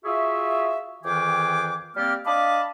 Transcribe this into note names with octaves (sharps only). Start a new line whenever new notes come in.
F4 F#4 G#4 E5
F2 D#3 E3 G#4 G5 D6
G3 A#3 C4 G4 D5 F6
D4 D#5 F5 A5 B5 D6